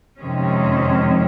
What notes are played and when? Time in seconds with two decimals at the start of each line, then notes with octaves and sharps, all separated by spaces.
0.19 F2 C3 D#3 G#3 C#4